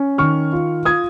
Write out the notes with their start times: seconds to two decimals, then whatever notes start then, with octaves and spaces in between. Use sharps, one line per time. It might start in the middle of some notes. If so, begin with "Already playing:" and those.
Already playing: C#4
0.18 D#3 C#6 F6
0.53 F4
0.85 F4 D#6 G#6